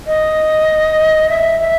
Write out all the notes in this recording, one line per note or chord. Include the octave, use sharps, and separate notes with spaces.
D#5
E5
E5